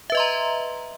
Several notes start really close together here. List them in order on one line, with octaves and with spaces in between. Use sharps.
E5 B4 D#5 C6 A#5